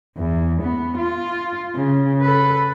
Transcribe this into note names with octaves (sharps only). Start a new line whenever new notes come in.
E2
B3
F4
C#3
A4 B4